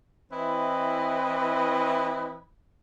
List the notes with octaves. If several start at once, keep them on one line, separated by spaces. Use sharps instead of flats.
E3 C4 E4 B4 D#5